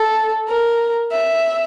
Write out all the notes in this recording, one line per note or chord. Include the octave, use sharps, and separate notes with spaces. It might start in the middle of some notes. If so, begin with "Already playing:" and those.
Already playing: A4
A#4
E5